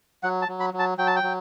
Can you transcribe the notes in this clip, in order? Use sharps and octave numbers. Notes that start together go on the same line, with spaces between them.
F#3 F#5
A5
F#3
B5
F#3
A5
F#3 G5
A5
G5
F#3